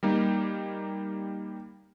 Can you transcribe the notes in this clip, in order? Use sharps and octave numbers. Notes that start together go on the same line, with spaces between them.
G3 A#3 D#4